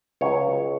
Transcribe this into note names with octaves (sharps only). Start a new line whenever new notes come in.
C#2 C#3 F#3 C#5